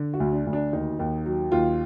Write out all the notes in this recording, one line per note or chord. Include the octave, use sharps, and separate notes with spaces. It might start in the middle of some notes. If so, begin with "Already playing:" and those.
Already playing: D3
F#4
D2
D4
D2
D4
D#2 D#4
D#2
F#3
D#2 F4